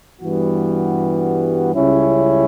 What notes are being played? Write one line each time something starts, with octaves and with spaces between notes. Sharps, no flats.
G2 E3 G3 B3 F#4
C#2 C#3 G3 C#4 E4